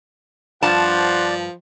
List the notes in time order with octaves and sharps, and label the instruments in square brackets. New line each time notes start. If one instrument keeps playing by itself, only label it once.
[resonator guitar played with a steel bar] G2 A5 [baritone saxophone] F3 [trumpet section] C5 F#5 [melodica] D5